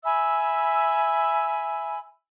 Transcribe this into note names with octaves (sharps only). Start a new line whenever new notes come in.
E5 G#5 B5 E6